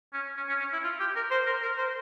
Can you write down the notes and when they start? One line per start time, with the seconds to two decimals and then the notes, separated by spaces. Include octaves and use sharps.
0.13 C#4
0.37 C#4
0.49 C#4
0.60 C#4
0.73 E4
0.83 F4
1.00 G4
1.16 A#4
1.31 C5
1.46 A#4
1.62 A#4
1.78 C5